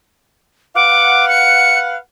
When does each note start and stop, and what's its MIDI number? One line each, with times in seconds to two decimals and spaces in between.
0.76 1.97 71
0.76 1.97 77
0.76 1.97 78
0.76 1.28 86
1.29 1.80 97